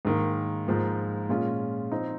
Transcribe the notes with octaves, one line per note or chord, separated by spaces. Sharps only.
G#2 D#3 A#3
G#2 F3 A#3
A#2 G#3 C#4 F4
F3 C4 D#4